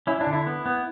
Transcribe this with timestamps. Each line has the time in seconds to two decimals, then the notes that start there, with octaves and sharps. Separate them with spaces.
0.07 C#4 E4
0.21 D4
0.27 D3
0.33 E4
0.47 B3
0.66 B3